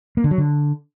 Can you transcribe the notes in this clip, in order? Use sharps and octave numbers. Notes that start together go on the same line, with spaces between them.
A#3
D3
F#3
D3